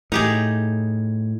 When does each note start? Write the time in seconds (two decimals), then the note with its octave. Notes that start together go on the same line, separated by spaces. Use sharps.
0.12 A2 D#4 G4 G#4